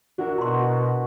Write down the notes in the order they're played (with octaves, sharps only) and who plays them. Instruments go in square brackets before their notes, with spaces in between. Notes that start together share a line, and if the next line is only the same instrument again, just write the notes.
[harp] D4 E4 A#4 [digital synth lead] F#4
[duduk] B2 [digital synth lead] F#4 [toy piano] A#5 C6